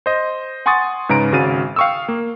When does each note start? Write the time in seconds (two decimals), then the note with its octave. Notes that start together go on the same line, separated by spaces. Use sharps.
0.06 C5 D#5
0.66 F#5 G#5 C6 C#6 D#6 A6
1.09 G#2 C#3 B4 A#5 D7
1.32 G#1 C#3 F#4 F5 A6 D#7
1.76 F5 G5 C#6 D#6 E6
2.08 A#3